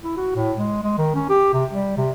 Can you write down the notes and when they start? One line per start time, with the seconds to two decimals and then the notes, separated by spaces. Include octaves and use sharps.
0.03 E4
0.16 F#4
0.35 A2
0.57 G#3
0.83 G#3
0.98 D#3
1.15 C#4
1.29 G4
1.53 C3
1.72 G3
1.97 C3